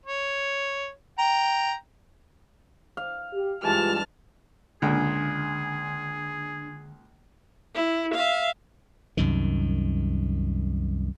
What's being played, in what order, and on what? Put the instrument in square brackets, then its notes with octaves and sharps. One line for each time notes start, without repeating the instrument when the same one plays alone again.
[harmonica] C#5
G5 A#5
[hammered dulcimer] F5
[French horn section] G4
[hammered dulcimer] G2 E3 [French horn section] G#3 F4 G4 [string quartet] A5 F6
[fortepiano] C#2 A#2 [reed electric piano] D3 [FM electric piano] D4 [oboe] G#4
[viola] E4
E5 F5
[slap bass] C2 F#2 D#3